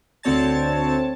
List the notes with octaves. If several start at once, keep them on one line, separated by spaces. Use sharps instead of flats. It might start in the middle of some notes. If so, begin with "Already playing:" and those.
D2 D3 C4 C#5 A5 A6